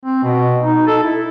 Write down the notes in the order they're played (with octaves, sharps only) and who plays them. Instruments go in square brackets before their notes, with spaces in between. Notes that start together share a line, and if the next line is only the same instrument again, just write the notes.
[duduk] C4
B2
D#4
A4
E4